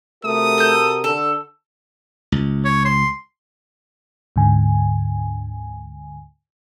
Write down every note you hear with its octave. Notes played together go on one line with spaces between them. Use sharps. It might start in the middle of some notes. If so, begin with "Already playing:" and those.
C3 A3 F#4 A#4 D#6
A4 G6
D3 A4
C#2
C#5
C6
D2 G#2 D3 G#5